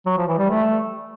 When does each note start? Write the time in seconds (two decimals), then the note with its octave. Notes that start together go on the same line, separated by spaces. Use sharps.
0.06 F#3
0.17 F3
0.28 E3
0.38 G3
0.49 A3